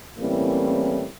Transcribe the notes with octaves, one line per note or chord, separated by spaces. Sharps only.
A2 E3 G3 A#3 C4 C#4